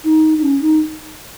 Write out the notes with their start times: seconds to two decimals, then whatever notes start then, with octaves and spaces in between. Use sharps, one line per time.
0.04 D#4
0.38 D#4
0.43 C#4
0.61 D#4